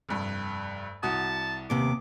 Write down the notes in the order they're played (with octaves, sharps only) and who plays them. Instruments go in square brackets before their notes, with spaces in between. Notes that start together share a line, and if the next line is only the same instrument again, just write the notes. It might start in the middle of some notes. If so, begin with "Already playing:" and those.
[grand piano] F1 G2
[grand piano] C2 F#4 D#6 [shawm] A5
[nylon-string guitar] D#2 C3 B3 [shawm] D6